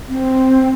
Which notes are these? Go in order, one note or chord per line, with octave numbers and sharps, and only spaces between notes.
C4